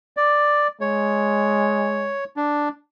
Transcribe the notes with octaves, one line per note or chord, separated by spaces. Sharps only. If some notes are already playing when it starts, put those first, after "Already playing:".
D5
G#3 C#5
D4